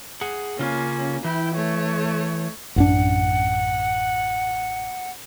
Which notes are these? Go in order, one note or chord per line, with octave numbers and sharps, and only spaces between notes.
G#4 F#5
C#3 A#3 C#4 F4
E3 E4 G5
A3 C#5
A1 F#2 D4 F#5